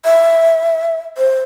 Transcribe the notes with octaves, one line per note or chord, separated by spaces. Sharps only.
E5
C5